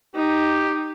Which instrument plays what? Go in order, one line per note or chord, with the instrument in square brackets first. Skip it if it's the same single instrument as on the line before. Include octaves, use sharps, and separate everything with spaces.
[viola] D#4 [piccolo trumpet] G4